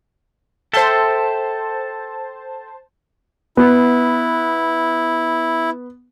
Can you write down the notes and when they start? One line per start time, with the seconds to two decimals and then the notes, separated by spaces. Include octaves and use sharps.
0.73 A4 C5 E5 G5 A5
3.57 B3 E4